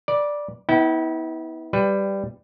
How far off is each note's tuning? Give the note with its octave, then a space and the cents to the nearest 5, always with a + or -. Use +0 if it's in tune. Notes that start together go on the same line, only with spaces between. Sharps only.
B4 -40 D5 +0
B3 +0 E4 -35 G5 -40
G3 +0 B4 +15